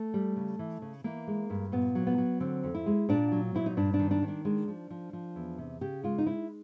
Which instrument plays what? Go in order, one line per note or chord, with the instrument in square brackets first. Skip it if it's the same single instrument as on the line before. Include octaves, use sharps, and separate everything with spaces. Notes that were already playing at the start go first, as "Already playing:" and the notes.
Already playing: [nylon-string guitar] A3
G3
C#3
E3
C#3
E3 A#3
G#3
G2
A#2 B3
F#3
B3
F#3
D3 C4
F2
E4
G#3
A#2 D4
F#3
A#2 E4
D#4
G2 D4
D4
D#3
D4
D#3
D4
G#3 D4
F3
F3
F3
E2
C3
C#3 G4
G#3 F4
D#4
G#3 E4